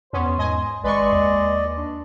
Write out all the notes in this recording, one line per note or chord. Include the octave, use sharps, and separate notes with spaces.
E2 B3 C#4 C5
G#2 D#5 G#5
G#1 G#3 B4 D5 D#5 C6 C#6
D#2
D4